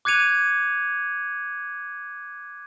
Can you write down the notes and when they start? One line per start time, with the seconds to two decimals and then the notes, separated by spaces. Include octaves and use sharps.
0.05 D6 F#6 G#6 C#7 D#7 F7